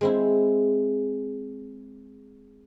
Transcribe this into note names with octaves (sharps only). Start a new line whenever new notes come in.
G#3 C4 E4